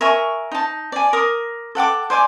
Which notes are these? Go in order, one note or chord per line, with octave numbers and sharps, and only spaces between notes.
A#4 E5 G#5 C#6
D#4 A5
D5 G#5
A#4 D6 D#6
A4 F#5 G5 D6
C5 D5 G#5 D6